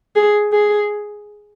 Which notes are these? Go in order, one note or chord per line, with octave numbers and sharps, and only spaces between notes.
G#4
G#4